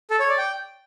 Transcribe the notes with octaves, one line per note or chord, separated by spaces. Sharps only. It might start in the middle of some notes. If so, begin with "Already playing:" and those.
A4
C#5
D5
G5